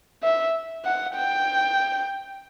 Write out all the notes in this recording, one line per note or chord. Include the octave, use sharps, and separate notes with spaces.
E5
F#5
G5